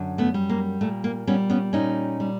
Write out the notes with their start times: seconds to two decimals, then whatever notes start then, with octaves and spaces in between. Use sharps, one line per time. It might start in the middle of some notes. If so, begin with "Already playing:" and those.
Already playing: F#2 D3
0.18 A3 B3
0.34 G3
0.49 A#3
0.81 A#2 A3
1.04 A#3
1.27 G3 B3 C#4
1.50 B3 C#4
1.73 A#2 C#4 D#4
2.20 G3